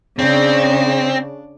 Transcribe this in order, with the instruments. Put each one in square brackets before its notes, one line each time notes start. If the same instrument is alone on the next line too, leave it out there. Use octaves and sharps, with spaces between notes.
[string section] C#3 [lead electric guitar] C4 [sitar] D4